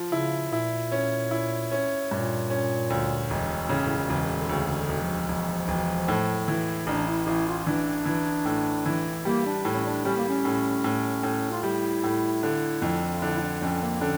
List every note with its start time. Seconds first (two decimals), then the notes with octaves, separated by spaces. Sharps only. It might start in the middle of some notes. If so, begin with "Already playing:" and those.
Already playing: F3
0.12 C#3 E4
0.51 A#2 E4
0.92 C#4
1.31 E4
1.72 C#4
2.11 G2 A#2
2.50 C#4
2.90 D2
3.30 E1
3.69 A2 C#3
3.85 A2
3.97 A#2
4.09 E1 C#3
4.23 A#2
4.39 D3
4.49 D2 C#3
4.67 C#3
4.76 D3
4.89 E1
5.01 F3
5.28 E1
5.68 E1
6.08 A2
6.48 E3
6.87 A1 D4
7.07 E4
7.27 A1 E4
7.47 F4
7.66 E3 D4
8.05 E3
8.46 A2
8.86 E3
9.25 G3 A#3
9.45 D4
9.64 A2 E4
9.74 C#4
9.85 D4
10.05 G3 C#4
10.17 A#3
10.29 C#4
10.45 A2
10.84 A2
11.23 A2
11.51 F4
11.63 G3 E4
12.04 A2
12.43 D3
12.82 F2
13.14 F4
13.21 D3 E4
13.34 E4
13.41 D4
13.62 F2 C#4
13.81 A#3
14.01 D3 C#4